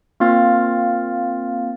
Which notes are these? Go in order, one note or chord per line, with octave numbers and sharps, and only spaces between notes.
A#3 C4 F4 F5 F6 A6